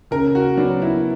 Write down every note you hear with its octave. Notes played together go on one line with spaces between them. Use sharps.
C#3 A#4
F#4
F#3 B3 D4
E4